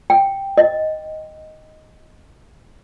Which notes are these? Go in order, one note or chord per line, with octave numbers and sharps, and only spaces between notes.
G5
D#5